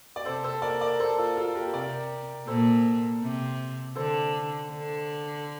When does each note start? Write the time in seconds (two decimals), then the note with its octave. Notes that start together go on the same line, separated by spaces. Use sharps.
0.16 D5
0.25 C3 A4 C5
0.44 A4 C5
0.62 A#4 D5
0.81 A#4 D5
1.00 A4 C5
1.18 F4 A4
1.37 F4 A4
1.55 G4 A#4
1.73 C3 A#4 D5
2.47 A#2 A4 C5
3.23 C3
3.95 D3 A4 C5
4.71 D3